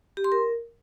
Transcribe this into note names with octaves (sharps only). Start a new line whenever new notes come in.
G4
C6
A#4